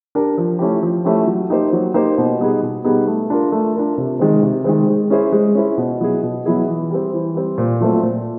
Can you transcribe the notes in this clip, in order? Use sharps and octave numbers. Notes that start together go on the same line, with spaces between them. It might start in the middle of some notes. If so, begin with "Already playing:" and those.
D4 G4 A#4
F3
A3 C#4 E4 G4
F3
A3 C#4 E4 G4
F#3
A#3 D#4 G4 C5
F#3
A#3 D#4 G4 C5
B2
G3 B3 D#4 G#4
B2
G3 B3 D#4 G#4
A3
D4 F4 A#4
A3
D4 F4 A#4
C3
D#3 G#3 C4
C3
D#3 G#3 C4
G#3
C#4 E4 G#4 C5
G#3
C#4 E4 G#4 C5
B2
F#3 B3 E4 G#4
B2
F#3 B3 E4 G#4
E3
G3 C4
E3
G3 C4
A#2
F#3 A3 C4 F4
A#2